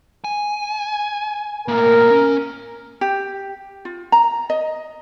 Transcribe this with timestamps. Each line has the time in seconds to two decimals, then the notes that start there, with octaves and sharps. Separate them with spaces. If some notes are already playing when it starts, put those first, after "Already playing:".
0.24 G#5
1.68 A2 A#3 A#4
2.10 C#4
3.01 G4
3.85 F4
4.12 A#5
4.50 D#5